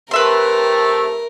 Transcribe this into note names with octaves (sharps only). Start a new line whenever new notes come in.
C3 A3 A#4 B4 E5 C6